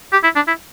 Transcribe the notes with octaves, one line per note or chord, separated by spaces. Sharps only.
G4
E4
D4
E4